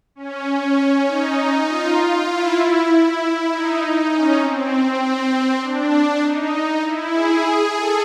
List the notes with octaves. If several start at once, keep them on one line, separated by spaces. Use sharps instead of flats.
C#4
C#4
D#4
F4
E4
E4
D#4
C#4
C4
C4
D4
D#4
E4
G#4
A4